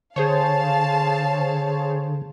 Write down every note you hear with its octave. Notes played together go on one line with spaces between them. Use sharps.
D3 G#4 C5 C#5 F5 A5